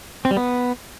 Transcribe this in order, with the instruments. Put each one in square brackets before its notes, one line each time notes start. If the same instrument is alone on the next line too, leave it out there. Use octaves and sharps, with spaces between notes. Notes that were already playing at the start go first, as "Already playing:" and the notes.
[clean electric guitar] C4
G3
B3